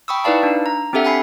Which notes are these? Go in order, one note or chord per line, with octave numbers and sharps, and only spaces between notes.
G5 B5 C#6 D#6 E6
D#4 E4 B4 D5 F5 A5
D4
A#5
C4 D4 G4 A4 E5 F#5
F#5 G#5 B5 C7